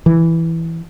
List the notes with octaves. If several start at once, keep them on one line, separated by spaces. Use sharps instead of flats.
E3